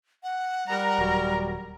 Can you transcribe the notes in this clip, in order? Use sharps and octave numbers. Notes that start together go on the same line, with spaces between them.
F#5
G3 A#4 A#5
D#1 F#3